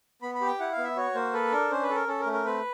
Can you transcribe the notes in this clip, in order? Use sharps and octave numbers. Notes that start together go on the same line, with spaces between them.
B3 B5
B5
G4
G5
E4 F#5
F5
B3
E5
F#4 C#5
A#3 C5
A4 B4
D4 A#4
C#4 C5
B4
A4
A#4
C#4 A4
A#4
A3
A#4
C4 B4